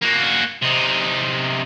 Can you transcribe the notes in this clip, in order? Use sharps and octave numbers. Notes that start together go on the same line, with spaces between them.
A#3 F#4
C3 D#4